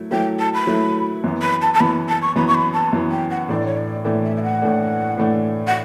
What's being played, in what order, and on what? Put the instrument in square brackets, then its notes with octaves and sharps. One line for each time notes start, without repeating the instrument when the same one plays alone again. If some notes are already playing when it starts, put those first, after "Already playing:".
Already playing: [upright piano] F#3 A3 E4
[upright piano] F#3 A3 E4 [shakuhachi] G5
[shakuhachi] A5
B5
[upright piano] F#3 A3 E4
F#2 E3 B3
[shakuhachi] B5
A5
A5
[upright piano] F#2 E3 B3 [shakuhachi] B5
[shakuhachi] A5
C#6
[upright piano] F#2 E3 B3 [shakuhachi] B5
[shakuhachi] C#6
B5
A5
[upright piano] F#2 E3 B3
[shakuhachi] G5
F#5
[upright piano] A2 E3 A3 D4 [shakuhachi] D5
[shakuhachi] C#5
D5
[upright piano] A2 E3 A3 D4 [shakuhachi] E5
[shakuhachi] E5
E5
F#5
[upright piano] A2 E3 A3 D4
A2 E3 A3 D4
[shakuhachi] F#5